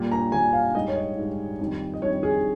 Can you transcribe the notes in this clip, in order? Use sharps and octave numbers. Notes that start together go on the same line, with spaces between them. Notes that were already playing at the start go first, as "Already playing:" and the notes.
Already playing: A#2 G3
A#5
A#2 G3 G#5
F5
G#2 G3 D#5
C#5
D#5
G#2 G3
F2 D#3 G3
D#5
F2 D#3 G3 C#5
G#4